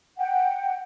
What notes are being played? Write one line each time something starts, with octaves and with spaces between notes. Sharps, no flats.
F#5 G5